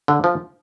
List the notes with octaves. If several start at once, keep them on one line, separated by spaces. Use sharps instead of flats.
D3
F3